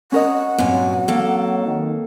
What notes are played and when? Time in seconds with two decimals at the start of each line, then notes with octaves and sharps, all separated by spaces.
0.12 C#4 A#4 D#5 F#5
0.58 G2 A#2 F#3 C4 G#5
1.08 A#3 A4
1.65 D#3